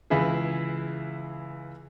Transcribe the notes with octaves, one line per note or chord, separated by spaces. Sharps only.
C#2 E3 E4 G#4